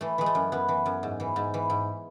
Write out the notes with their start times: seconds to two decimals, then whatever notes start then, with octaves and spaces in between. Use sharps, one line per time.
0.01 E3 A3
0.18 E3 G#3
0.26 A3
0.35 F#2
0.52 F#2 B3
0.68 E3
0.86 F#2
1.03 G#2
1.20 E3
1.36 G#2
1.54 E3
1.70 G#2